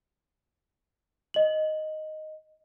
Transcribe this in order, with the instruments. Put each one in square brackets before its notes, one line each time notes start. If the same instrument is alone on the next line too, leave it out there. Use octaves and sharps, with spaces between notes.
[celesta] D#5 F#7